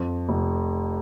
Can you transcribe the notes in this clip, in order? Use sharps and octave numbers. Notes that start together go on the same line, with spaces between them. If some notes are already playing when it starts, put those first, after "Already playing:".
Already playing: F2
F1